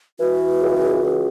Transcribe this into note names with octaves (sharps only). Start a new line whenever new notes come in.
E3 F#4
C#2
C#2